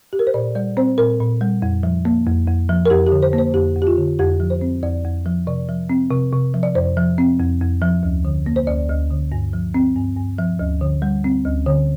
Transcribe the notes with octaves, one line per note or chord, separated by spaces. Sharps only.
G4
A#4
C5
A#2 D5
G3 D5
C4 C5
A#2 A#4
A#2
G3
F2
F3
A#3
F2
F2
F3
A#4
F2 G4
G4
D3
C5
A#3
C5
F2 G4
F2
G4
F4
D3
F2 G4
F3
C5
C4
F2 D5
F2
F3
C3 D5
F3
C4
C3
C3
F3
D5
F2 C5
F3
C4
F2
F2
F3
D2
D3
A#3
C5
D2 D5
D2
D3
G2
F3
C4
G2
G2
F3
D2
D3
G3
C4
D2
D3